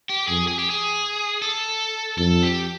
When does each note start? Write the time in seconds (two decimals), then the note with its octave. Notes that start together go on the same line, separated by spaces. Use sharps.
0.09 G4
0.28 F2 G#4
0.48 G#4
0.59 G4
0.70 G#4
1.42 A4
2.17 F2 A4
2.42 G4